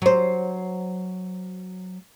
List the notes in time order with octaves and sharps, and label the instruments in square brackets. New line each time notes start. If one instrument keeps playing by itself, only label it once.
[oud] F#3 C5